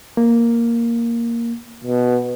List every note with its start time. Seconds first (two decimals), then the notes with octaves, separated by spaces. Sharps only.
0.17 A#3
1.84 B2